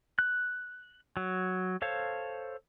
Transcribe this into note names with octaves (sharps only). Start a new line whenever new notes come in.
F#6
F#3
A4 C5 C#5 F5